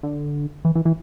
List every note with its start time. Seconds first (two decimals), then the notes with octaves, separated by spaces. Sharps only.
0.03 D3
0.65 E3
0.75 E3
0.85 E3